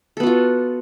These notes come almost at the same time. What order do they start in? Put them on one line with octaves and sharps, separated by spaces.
A4 B3 F#4 F4